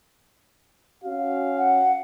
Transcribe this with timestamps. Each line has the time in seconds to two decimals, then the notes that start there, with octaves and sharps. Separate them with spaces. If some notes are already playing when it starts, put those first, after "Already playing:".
1.03 C#4 F#4 F5
1.57 F#5